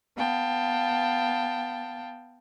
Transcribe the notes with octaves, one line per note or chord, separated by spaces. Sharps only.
B3 F5 G5 A5